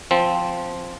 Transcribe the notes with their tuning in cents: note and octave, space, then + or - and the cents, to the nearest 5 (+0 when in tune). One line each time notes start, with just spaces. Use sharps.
F3 +0 C4 +0